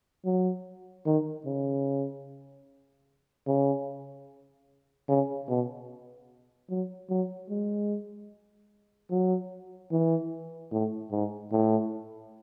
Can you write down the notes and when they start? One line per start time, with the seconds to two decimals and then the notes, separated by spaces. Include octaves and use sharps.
0.25 F#3
1.06 D#3
1.46 C#3
3.47 C#3
5.08 C#3
5.48 B2
6.69 F#3
7.09 F#3
7.49 G#3
9.11 F#3
9.91 E3
10.72 A2
11.11 G#2
11.52 A2